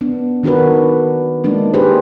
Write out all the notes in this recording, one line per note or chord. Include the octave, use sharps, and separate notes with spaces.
B3 D4
D#3 D4 F#4 A#4 B4
G#3 A#3 D4 D#4
A#3 D4 G4 G#4 B4 C5